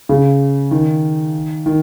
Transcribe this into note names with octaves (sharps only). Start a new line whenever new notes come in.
C#3
D#3
D#3